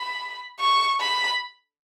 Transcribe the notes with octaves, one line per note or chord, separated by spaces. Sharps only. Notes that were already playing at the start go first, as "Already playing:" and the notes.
Already playing: B5
C#6
B5